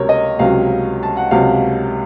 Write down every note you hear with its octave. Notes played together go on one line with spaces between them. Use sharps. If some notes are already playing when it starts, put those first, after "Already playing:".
Already playing: C#2 C3 F#3 A#4 C#5
D#5
C#2 C3 F#3 F5
A5
F#5
C#2 C3 F#3 F5